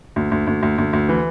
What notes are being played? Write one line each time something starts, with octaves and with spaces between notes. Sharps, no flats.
D2
D2
D2
D2
D2
D2
E3